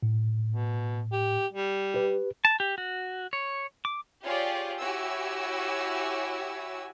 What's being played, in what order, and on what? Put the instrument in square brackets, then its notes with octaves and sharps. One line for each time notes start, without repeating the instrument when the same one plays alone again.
[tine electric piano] A2
[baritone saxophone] B2
G4
G3
[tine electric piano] G4 B4
[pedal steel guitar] A5
G4
F#4
C#5
D6
[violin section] F4 G4 G#4 C#5 D5
E4 F#4 G4 C#5 G#5 E6